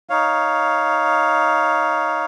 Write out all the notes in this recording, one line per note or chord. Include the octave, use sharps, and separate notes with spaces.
D#4 C#5 F5